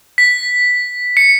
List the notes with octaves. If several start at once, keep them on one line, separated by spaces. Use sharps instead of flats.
B6
C#7